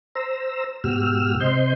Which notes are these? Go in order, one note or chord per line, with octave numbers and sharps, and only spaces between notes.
C5 A#5 E6
G#2 B2 F#4 G4 E6 F6
C3 C5 D#5 C6 G6